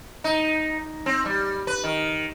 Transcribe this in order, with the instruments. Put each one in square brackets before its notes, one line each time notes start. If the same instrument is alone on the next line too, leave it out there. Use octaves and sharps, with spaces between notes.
[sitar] D#4
C4
G3
B4
D#3